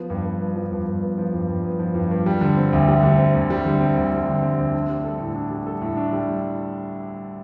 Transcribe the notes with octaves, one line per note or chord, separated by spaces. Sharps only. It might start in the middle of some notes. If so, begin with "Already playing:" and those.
Already playing: F3 B3
G2
G2
B3
F3
G2
G2
B3
F3
G2
G2
B3
F3
G2
G2
G3
D3
C4
D2
G3
D3
C4
D2
G3
D3
C4
D2
G3
D3
C4
D2
D4
G3
A4
A2
D4
G3
A4
A2
D4
G3